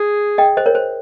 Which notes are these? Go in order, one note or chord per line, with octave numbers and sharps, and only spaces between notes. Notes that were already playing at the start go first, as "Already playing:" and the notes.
Already playing: G#4
D#5 G5
C5 D#5
A#4 C#5
C5